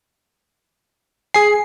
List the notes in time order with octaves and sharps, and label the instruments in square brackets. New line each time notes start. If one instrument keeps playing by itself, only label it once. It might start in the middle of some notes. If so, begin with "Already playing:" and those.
[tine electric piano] G#4 C7 [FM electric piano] G#5